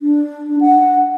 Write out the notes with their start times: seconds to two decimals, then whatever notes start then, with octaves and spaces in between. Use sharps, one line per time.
0.01 D4
0.61 F#5